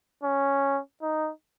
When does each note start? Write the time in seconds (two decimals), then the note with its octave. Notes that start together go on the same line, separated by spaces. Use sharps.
0.24 C#4
1.02 D#4